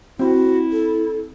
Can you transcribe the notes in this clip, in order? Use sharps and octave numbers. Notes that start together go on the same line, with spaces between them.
C4 E4 F#4
A4